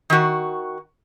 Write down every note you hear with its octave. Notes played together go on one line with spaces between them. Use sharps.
D#3 F#4